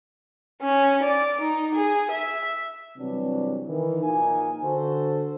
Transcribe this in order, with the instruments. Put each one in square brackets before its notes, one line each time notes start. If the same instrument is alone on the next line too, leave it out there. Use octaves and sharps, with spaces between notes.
[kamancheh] C#4
D5
D#4
G#4
E5
[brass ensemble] C3 E3 F#3 G3 D4
D#3 E3
A#1 A#3 D#4 G#5
D3 F#4 A4 C5